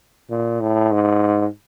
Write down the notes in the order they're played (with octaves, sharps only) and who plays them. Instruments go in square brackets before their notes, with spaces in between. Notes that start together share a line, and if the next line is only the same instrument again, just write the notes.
[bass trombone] A#2
A2
G#2